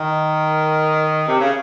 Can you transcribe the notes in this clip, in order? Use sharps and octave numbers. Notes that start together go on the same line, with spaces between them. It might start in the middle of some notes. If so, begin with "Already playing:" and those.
Already playing: D#3
C3
C#3